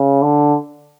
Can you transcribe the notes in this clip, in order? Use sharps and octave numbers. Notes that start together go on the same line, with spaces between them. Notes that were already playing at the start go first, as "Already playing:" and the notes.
Already playing: C#3
D3